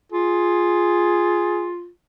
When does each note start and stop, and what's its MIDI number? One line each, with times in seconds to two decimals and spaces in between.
0.12 1.89 65
0.12 1.72 68